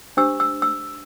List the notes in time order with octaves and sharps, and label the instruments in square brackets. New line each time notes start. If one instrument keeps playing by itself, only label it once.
[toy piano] D4 G4 C5 E6
E6
E6